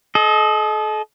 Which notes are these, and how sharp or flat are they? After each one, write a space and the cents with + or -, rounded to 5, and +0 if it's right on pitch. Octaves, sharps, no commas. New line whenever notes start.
A4 -40 D#5 +0